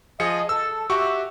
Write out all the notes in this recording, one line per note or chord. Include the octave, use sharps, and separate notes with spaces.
F3 G#4 D#5 C#7
A4 E6
F#4 G4 E5 C#6